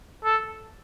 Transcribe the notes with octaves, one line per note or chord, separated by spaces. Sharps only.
A4